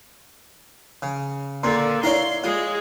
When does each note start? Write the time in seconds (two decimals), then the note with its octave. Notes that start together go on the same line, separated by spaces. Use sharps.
1.02 C#3
1.63 A#2 D3 A#3 C6 C7
2.03 E4 C#5 D5 F5 A#5 C6
2.44 G#3 F4 G#4